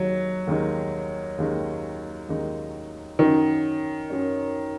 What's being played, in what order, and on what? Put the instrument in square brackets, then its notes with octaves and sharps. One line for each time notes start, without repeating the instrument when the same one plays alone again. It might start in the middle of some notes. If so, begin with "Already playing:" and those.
Already playing: [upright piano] D#2 D#3 G#3 D#4 [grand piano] F#3
[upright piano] D#2 D#3 G#3 D#4
D#2 D#3 G#3 D#4
D#2 D#3 G#3 D#4
[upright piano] F#2 F#3 C#4 [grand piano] D#3
[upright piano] F#2 F#3 C#4